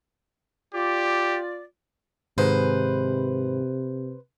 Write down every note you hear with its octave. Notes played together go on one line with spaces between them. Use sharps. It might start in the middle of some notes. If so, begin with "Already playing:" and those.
F4 G4 D5
G#2 C3 D#3 G#3 B4 C5